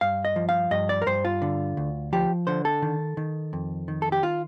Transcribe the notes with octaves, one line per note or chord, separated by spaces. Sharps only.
G2 F5
D#5
F3
F5
G2 D#5
D5
A#4
G2 C5
F4
D3
D2
F3 G4
D3 C5
A4
D#3
D#3
F2
D#3
A4
G4
F4